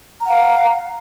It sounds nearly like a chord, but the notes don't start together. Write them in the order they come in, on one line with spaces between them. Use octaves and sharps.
A#5 F#5 F5